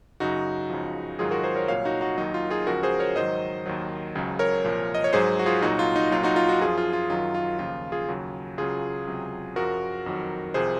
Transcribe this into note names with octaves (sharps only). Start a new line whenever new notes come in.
F#2 C#3 F#3 D#4 F#4
C#2 C#3 F3
G#2 D#3 F#3 F4 G#4
F#4 A#4
G#4 C5
A#4 C#5
C2 A#2 F#3 C#5 F5
D#4 F#4
D#4 F#4
D#2 D#3 F#3 D#4
F4
F4 G#4
C#2 C#3 F3 F#4 A#4
G#4 C5
A#4 C#5
G#2 D#3 F#3 C5 D#5
D#2 D#3 F#3
C#2 C#3 F#3
A#4 C#5
C2 A#2 F3
D#5
C#5
G#2 F#3 G#4 C5
F#4
F4 G#4
C2 A#2 F#3 D#4 F#4
F4
D#4
C2 A#2 F#3 F4
D#4 F#4
F4
D#4 F#4
F#2 F3 F4 G#4
F4
F4
F#2 D#3 F#3 F4
F4
D#2 C#3 F3 F4
F4 G#4
D#2 C#3 F#3
C#2 C#3 F#3 F4 G#4
C#2 C3 F#3
F#2 F3 F#4 A#4
F2 D#3 F#3
C2 C3 F3 G#4 C5